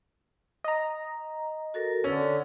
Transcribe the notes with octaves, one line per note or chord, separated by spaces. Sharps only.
D#5 A#5
F#4 A4 A#4
D3 C#4 A4 B4 E6